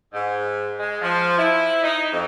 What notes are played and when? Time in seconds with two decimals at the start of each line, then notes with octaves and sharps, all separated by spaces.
0.13 G#2
0.79 G#3
1.02 F3
1.38 E4
1.82 D#4
2.12 F2